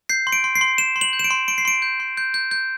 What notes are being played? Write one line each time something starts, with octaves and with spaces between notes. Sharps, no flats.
G6 C7
C6
D7
C6
C7
C6
C6 E7
C6
F#7
G6
E7
D7
C6
C6 D7
C7
C6 D7
G6
C6
G6
G6
G6